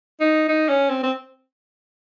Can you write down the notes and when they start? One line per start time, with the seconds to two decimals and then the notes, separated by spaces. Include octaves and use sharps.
0.21 D#4
0.48 D#4
0.69 C#4
0.90 C4
1.03 C4